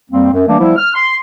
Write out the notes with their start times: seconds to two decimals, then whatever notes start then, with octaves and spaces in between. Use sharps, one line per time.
0.11 F2 G3 A#3 C4
0.32 F#2
0.48 E3 G3 A3 A#3 D4
0.60 F3 G3 B3 E4
0.77 F6
0.95 C6